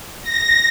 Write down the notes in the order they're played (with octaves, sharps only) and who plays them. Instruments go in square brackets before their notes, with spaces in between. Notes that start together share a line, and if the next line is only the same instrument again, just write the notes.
[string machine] A#6